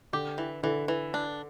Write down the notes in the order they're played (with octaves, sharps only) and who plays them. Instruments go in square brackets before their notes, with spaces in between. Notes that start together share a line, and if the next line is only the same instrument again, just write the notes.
[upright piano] D3 [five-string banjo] G4
[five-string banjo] E3
[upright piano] D3 [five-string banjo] E3
[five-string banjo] E3
D4